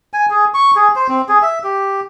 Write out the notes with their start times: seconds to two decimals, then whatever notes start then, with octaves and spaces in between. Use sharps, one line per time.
0.14 G#5
0.30 G#4
0.54 C#6
0.76 G#4
0.96 C5
1.08 C4
1.29 G#4
1.42 E5
1.64 G4